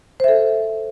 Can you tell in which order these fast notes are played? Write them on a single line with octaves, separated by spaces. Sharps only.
C5 E5 A4